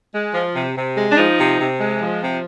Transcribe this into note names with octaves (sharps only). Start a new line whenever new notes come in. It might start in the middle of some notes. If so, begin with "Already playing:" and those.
G#3
F3
C3
C3
G#3
D4
F3 D#4
C3
C3
G#3
F3
C3